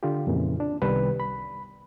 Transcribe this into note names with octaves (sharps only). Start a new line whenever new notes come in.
D3 F4 G4
F2 A#2 C#3 E3
D4
C2 D#3 G3 B3 B4
B5